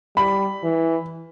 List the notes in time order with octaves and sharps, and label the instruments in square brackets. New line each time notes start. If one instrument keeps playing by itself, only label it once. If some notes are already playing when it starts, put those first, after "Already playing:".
[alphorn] G3 [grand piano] B5
[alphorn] E3